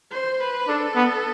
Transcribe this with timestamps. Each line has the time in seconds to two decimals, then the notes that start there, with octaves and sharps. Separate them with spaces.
0.11 C5
0.40 B4
0.68 D4 A4
0.95 B3